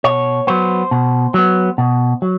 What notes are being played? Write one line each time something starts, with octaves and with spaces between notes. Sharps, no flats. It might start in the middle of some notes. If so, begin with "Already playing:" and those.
B2 C#5
F#3 B3 C5
B2
F#3 B3
B2
F#3